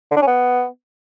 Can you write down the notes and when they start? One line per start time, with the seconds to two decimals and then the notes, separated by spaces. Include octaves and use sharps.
0.11 D3
0.17 D4
0.22 C#4
0.27 B3